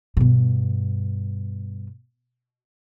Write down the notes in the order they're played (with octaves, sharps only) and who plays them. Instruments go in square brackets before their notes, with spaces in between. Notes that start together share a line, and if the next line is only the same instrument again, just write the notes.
[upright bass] G2 B2